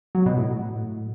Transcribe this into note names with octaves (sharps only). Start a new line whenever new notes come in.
F#3
B2
A2